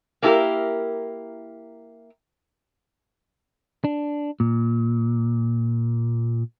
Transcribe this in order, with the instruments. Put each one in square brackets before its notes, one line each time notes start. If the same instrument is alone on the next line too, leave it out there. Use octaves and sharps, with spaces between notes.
[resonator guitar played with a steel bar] A#3 D4 E4 F4 G4 A#4
[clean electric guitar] D4
A#2